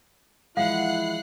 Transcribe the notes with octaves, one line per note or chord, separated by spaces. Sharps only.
E3 F3 G#3 E4 F5 F#5 F#6 C7